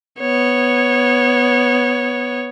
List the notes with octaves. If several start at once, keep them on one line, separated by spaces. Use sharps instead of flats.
B3 C#5